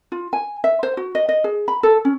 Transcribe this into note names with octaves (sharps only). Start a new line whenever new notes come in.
F4
G#5
E5
C5
F#4
D#5
D#5
G#4
B5
A4
C#4